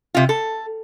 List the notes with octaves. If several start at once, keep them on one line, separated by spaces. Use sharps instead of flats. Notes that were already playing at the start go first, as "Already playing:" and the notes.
C3 F4
A4